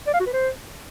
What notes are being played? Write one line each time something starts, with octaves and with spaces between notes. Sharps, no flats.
D5
F5
F#4
B4
C5